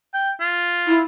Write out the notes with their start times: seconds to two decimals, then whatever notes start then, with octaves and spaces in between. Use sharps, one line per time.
0.14 G5
0.40 F4
0.87 E4